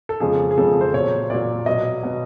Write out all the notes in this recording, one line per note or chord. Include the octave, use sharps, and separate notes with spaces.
A4
F2 C#3 F3 G#3 G#4
G#4
F2 C#3 F3 G#3 A4
C5
A#2 F#3 C#5
A#2 F#3 D5
B2 F#3 D#5
B2 F#3